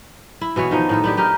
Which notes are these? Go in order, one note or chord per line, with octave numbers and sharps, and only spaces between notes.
E4
B2 E3 B3 C#5
D#3 F3 D#4
A2 D#3 A4
B3 D4 G4
D#4 G4 A#4